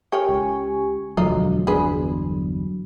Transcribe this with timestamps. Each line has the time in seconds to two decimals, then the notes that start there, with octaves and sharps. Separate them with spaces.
0.12 G4 A#4 C#5 G5 G#5 C#6
0.29 C#2
1.17 E1 D2 F3 F#3 D4 D#4 F4
1.67 G1 E2 D4 G#4 B4 C5